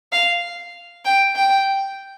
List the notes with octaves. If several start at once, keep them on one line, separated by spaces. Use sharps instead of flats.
F5
G5
G5